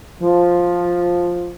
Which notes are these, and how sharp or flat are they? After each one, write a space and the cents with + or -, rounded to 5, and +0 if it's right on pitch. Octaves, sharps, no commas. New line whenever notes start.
F3 +5